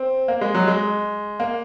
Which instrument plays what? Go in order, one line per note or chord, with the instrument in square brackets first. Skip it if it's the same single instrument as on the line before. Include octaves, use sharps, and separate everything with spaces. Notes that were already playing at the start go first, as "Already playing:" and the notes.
Already playing: [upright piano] C4
A#3
G#3
F#3
G#3
A#3